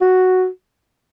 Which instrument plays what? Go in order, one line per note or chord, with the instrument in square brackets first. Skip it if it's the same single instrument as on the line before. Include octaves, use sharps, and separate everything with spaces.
[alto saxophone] F#4